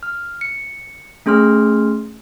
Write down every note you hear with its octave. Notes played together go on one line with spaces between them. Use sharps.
F6
C#7
A3 C#4 G#4 C6 F6